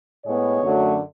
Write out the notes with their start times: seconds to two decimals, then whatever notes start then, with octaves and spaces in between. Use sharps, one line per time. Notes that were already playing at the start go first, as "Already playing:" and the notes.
0.25 A2 G#3 B3 C#5
0.61 F#2 D3 F#3 A3